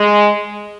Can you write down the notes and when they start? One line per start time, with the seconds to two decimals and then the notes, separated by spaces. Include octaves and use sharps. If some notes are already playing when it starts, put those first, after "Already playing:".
Already playing: G#3